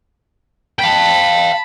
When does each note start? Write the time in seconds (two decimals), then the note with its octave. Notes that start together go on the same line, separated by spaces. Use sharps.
0.79 F5 G5 A5 B5